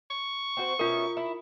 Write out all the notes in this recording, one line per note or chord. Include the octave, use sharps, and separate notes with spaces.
C#6
C4 F#4 C5
B2 C#4 F4 A#4 E5
E4